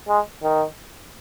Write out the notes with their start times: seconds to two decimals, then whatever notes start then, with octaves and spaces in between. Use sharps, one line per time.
0.08 G#3
0.43 D#3